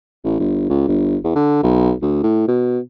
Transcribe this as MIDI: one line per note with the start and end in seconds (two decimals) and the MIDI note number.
0.24 0.38 33
0.40 0.67 31
0.69 0.86 37
0.88 1.16 31
1.24 1.33 40
1.35 1.58 50
1.63 1.93 35
2.02 2.21 38
2.23 2.44 45
2.48 2.79 47